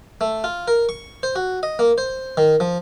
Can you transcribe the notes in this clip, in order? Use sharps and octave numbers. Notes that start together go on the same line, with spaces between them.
A3
F4
A#4
C#6
C5
F#4
D#5
A#3
C5
D#3
F3